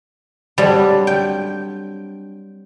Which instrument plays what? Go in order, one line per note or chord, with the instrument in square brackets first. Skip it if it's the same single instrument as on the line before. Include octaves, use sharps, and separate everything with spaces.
[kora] F#3 C4 D4 [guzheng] G3
[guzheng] G5